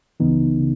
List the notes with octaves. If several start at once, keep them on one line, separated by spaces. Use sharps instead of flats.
C#2 C#3 E3 B3 D#4
C#3